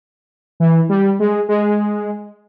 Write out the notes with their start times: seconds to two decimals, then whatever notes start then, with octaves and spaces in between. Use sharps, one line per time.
0.60 E3
0.89 G3
1.19 G#3
1.49 G#3